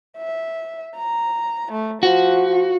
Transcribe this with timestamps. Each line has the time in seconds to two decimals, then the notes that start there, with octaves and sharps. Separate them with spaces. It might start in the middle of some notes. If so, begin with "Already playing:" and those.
0.18 E5
0.97 A#5
1.72 A3
2.03 F3 F#4